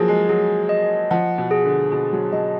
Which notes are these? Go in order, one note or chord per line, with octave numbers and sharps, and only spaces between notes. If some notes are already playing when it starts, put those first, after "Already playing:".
Already playing: F3 F#3 A#3 G#4
G#3
F#3 G#4
D#5
F3 F#5
B2
G#4
D3
B2 G#4
F#3
F#3 D#5